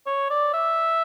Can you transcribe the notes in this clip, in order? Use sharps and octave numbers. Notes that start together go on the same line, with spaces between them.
C#5
D5
E5